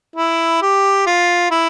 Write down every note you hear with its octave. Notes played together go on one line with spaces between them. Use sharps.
E4
G4
F4
E4